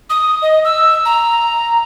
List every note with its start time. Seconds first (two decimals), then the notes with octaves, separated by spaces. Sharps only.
0.10 D#6
0.42 D#5
0.65 E6
1.05 A#5